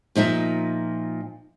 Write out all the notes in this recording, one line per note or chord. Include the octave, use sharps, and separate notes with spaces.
A#2 F3 D#4 E5